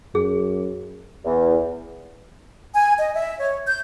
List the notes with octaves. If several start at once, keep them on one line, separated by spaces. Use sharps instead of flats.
F#2 G#4
E2
G#5
D#5
E5
C#5
G6